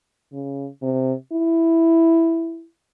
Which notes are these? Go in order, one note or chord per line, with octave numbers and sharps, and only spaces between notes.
C#3
C3
E4